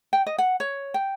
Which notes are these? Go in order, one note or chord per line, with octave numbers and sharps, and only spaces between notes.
G5
D#5
F#5
C#5
G5